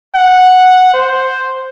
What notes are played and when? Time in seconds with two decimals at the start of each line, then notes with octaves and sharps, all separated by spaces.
0.15 F#5
0.94 C5